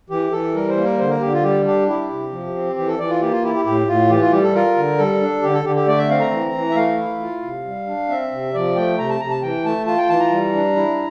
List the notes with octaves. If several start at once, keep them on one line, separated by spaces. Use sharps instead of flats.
E3 G4
E3 A4
G3 A#4
C5
A#3
A#4
D3 C5
A#4
D3 G4
F4
G3 G4
D4 G4
E4 G4
C3
F3
C4
E3 G4
A4
E3 D5
F4
A#3 G4
F4
E4 G4
G4
A2 G4
A2 F4
E3 G4
F4
G3 G4
A4
F4 A#4
D3
G3 A4
D4
D3 G4
A4
D3 G4
G4
A3 D5
E5
C4 F5
A#5
E3
E3
E5
A3 F5
E4
F4
C3
G3
D4
C4 E5
C3
F3 D5
A3 G5
C3 A#5
A5
C3 A#5
A5
E3 G5
A3 A5
F4 A5
G5
E3 A5
A#5
G3
D4
E4